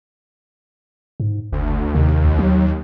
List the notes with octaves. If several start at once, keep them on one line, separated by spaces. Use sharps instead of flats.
G#2
F#1 D2
D#2 C3
C#2
F#3